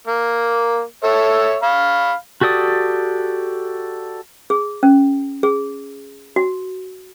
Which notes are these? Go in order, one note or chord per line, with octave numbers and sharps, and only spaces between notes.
A#3
A4 C#5 E5
F5 B5
F#4 G4 A4 D5 D#6
G#4
C#4
G#4
F#4